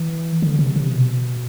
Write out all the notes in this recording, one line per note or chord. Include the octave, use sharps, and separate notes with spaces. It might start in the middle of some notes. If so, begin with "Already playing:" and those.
Already playing: E3
D3
C3
C3
B2